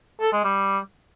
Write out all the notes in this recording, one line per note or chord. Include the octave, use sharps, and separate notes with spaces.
A4
G#3
G3